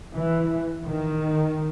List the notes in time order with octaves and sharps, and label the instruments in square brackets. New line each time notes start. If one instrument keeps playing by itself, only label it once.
[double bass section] E3
D#3